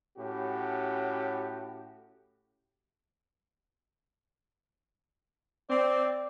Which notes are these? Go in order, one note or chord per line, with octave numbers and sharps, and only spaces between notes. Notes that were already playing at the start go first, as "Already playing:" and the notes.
A2 C#4 F#4 G4
C4 D5